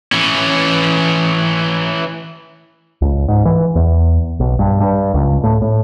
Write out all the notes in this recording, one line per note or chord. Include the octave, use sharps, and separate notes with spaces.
E3 C#4
C#2
G#2
E3
E2
B1
G2
G2
C#2
A2
A2